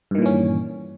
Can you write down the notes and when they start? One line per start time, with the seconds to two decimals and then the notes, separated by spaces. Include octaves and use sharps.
0.11 G2
0.15 D#3
0.18 A#2
0.22 E3
0.26 C#4